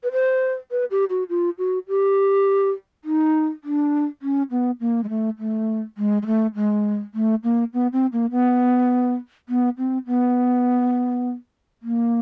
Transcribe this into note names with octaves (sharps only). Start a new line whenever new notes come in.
B4
C5
B4
G4
F#4
F4
F#4
G4
D#4
D4
C#4
B3
A#3
G#3
A3
A3
G#3
G#3
A3
G#3
A3
A#3
B3
C4
A#3
B3
B3
C4
B3
A#3